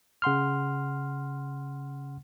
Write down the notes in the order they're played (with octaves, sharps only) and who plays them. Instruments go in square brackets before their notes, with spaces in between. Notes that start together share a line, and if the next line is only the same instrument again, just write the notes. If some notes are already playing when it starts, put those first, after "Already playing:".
[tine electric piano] C#3 F#5 C6 F6